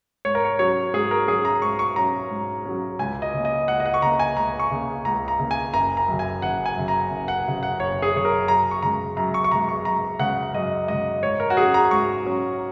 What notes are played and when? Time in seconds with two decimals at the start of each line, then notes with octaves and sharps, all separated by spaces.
0.25 G#2 C#5
0.35 A#4
0.45 C#5
0.59 F#3 C#4 C#5
0.94 G#2 G#4
1.11 A#4
1.28 F#3 C#4 G#4
1.45 A#5
1.62 G#2 C#6
1.79 C#6
1.96 F#3 C#4 A#5
2.30 G#2
2.65 F#3 C#4
2.99 C#2 G#5
3.22 D#5
3.34 C#3 A#3
3.45 D#5
3.68 C#2 F#5
3.80 D#5
3.86 F#5
3.94 C#6
4.02 C#3 A#3 A#5
4.19 G#5
4.36 C#2 A#5
4.59 C#6
4.71 C#3 A#3
5.05 C#2 A#5
5.28 A#5
5.40 C#3 A#3
5.51 G#5
5.74 F#1 A#5
5.97 A#5
6.08 F#2 C#3
6.19 G#5
6.42 F#1 F#5
6.66 G#5
6.77 F#2 C#3
6.88 A#5
7.11 F#1
7.28 F#5
7.45 F#2 C#3
7.63 F#5
7.79 F#1 C#5
8.02 G#4
8.14 F#2 C#3 C#5
8.25 A#4
8.48 F#2 A#5
8.71 C#6
8.82 C#3 G#3 A#5
9.17 F#2 A#5
9.34 C#6
9.44 C#6
9.51 C#3 G#3 A#5
9.69 C#6
9.85 F#2 A#5
10.19 C#3 G#3 F#5
10.54 F#2 D#5
10.88 C#3 G#3 D#5
11.23 G#2 C#5
11.40 A#4
11.50 F#4
11.57 F#3 C#4 G#4
11.74 A#5
11.91 G#2 C#6
12.25 F#3 C#4